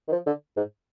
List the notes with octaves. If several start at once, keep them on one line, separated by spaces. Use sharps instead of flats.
D#3
F3
D3
G#2